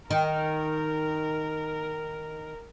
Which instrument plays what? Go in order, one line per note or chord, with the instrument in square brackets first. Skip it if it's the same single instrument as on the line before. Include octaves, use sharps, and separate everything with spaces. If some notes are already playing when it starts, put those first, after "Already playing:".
[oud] D#3 [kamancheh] A#4